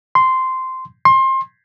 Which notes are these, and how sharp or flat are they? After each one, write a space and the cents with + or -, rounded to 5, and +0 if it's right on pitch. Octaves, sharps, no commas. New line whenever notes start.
C6 -10
C6 +25